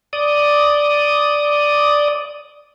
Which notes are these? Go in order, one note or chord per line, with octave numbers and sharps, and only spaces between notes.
D5 D#6